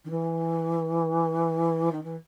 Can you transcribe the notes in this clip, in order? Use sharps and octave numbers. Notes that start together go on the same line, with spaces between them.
D#3
E3
D#3
E3